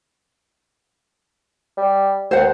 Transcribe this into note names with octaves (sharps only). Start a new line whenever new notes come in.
G3
D#2 C5 F#5